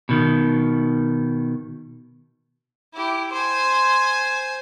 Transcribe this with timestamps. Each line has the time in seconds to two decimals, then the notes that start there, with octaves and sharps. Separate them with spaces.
0.09 B2 D#3
2.93 E4 G4
3.32 C5 G#5 C6